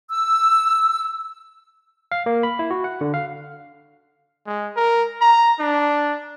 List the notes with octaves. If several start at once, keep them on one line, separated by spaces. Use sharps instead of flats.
E6
F5
A#3
B5
E4
F#4
F#5
D3
F5
G#3
A#4
A#5
D4